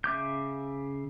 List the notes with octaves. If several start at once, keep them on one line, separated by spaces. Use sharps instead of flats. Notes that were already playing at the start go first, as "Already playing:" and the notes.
C#3 E5 D6 G6